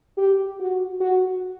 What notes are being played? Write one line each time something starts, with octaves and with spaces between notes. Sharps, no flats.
G4
F#4
F#4